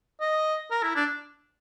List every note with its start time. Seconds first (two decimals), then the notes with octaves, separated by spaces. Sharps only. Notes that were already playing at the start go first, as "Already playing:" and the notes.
0.20 D#5
0.71 A#4
0.83 E4
0.96 D4